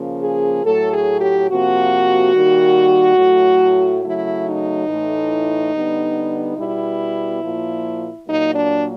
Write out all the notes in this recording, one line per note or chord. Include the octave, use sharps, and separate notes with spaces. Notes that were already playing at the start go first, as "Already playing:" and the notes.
Already playing: C#3 F3 A#3
G#4
A2 F#3 A3 A4
G#4
G4
C3 F3 A#3 F#4
D#3 G3 A#3
A2 F#3 A3
C#3 F#3 A3 E4
D#4
A2 E3 A3
D3 G3 B3
B2 G3 B3 E4
A#2 F3 A#3
A#2 F#3 A#3 D#4
D4